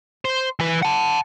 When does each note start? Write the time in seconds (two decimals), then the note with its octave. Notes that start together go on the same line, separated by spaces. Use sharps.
0.25 C5
0.60 E3 B4
0.82 F#5 A5